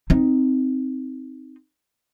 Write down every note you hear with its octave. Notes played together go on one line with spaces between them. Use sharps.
C4 D#4